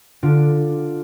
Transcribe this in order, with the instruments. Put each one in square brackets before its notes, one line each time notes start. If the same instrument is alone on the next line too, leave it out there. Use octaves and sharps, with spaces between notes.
[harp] D3 D4 F4